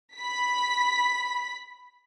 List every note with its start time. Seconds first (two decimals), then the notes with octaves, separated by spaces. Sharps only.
0.17 B5 B6